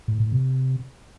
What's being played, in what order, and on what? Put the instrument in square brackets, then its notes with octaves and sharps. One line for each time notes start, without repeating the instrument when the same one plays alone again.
[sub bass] A2
A2
C3